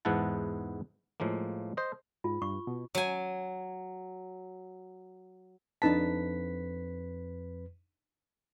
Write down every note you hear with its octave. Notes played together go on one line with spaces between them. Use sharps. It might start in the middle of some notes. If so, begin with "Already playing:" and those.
E2 G#2 B3 E4 F#5 A5
A2 F3 G#3 A#3
C5 D#5
G#2 F4
G2 C#6
B2
F#3 G#5
F2 D4 D#4 B4 A5 B6